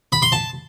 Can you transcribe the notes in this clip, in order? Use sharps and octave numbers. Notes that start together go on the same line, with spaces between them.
B5
C6
A5